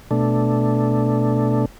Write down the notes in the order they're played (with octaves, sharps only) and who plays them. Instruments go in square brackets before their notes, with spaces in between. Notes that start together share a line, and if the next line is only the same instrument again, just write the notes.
[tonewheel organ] B2 A3 D4